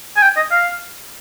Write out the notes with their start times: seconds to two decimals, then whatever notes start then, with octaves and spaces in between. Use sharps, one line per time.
0.17 G#5
0.23 G5
0.37 D#5
0.51 F5